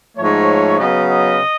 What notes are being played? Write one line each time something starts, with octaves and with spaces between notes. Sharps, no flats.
G#2 F3 A3 C#5
C#3 F#3 B3 D#5
D#5